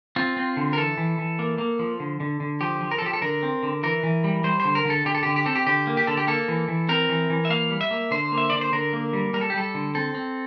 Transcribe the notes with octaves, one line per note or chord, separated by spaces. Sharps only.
C4 F4
C4
D3
A#4
E3 A4
E3
E3
A#3
A#3
F3
D3
D3
D3
F3 G4
F3
A#4
A4
F3 G4
A4
D3 A#4
C4
D3
E3 A#4
E3
G3
G3 C5
C5
D3
A#4
D3
A4
D3 G4
A4
D3 G4
G4
C4 A4
G4
D3 G4
A#3
G4
D3 A4
G4
A#3 A4
E3
E3
C4 A#4
E3
E3
E5
A#3 F5
G3
E5
A#3
D3 C5
A#3
E5
D3 D5
C5
D3 A#4
A#3
G3
G3 A#4
A4
G4
G3 A4
D3
C4 A4
C4